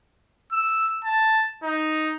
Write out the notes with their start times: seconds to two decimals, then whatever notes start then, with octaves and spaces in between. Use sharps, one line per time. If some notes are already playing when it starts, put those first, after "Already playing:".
0.52 E6
1.05 A5
1.63 D#4